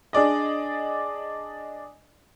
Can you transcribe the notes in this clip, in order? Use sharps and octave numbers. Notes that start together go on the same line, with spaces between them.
D4 G#4 D5 D#5